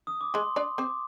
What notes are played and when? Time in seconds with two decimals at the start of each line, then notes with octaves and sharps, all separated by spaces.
0.07 D#6
0.21 D6
0.34 G#3 G#4 C6
0.56 D4 D5
0.78 C4 C5 D6